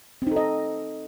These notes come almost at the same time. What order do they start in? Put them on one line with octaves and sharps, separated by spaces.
C4 D#4 A4 D#5